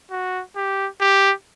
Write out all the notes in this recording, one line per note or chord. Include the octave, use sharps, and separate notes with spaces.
F#4
G4
G4